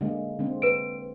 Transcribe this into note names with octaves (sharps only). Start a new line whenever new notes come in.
D3 G#3 A#3
D3 G#3 C4
B4 D7